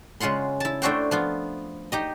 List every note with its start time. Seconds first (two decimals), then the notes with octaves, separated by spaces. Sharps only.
0.20 C#3 G#3 F4 F#5 C6
0.60 E4 A5
0.82 A3 D4 E4 F#4 C5 G5
1.11 F3 B3 F4
1.92 D#4 G4 D#5